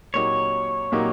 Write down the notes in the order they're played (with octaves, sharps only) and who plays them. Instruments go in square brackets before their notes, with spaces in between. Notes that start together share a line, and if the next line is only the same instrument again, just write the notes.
[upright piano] A#2 F#3 A#3 D#4 G4 [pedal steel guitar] C#5
[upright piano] A#2 F#3 A#3 D#4 G4